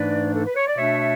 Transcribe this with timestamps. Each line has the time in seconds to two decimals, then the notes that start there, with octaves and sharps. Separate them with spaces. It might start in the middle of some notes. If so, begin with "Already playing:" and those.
Already playing: G#2 E3 A3 D4 B4 D5
0.35 A4
0.46 B4
0.56 C#5
0.67 D5
0.77 B2 A3 D4 C#5 E5